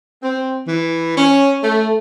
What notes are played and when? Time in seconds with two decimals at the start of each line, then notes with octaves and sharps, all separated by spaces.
0.23 C4
0.67 E3
1.18 C#4
1.64 A3